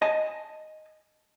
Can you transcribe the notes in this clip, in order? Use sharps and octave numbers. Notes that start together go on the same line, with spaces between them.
D#5 G#5 A5